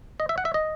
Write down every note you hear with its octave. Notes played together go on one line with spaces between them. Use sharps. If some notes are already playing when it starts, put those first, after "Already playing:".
D#5
E5
F#5
E5
D#5